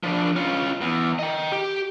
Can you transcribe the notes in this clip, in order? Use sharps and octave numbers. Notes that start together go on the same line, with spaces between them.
F3 D4
C#4 F4
E2
D#5 G5
G4